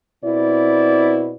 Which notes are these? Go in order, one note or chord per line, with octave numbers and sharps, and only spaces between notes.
B2 C4 E4 D5